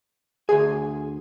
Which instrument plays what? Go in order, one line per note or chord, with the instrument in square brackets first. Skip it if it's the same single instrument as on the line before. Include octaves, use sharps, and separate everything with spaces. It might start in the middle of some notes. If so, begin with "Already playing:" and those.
[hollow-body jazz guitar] D2 G#5 [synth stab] G#4